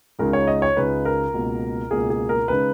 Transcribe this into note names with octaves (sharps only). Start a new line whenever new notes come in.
C#2 C#3 G#3 D#4 A#4
C#5
D#5
C#5
C#2 C#3 G#3 D#4 B4
A#4
C#2 B2 A#3
C#2 B2 A#3 G#4
G#4
A#4
C#3 G#3 D#4 B4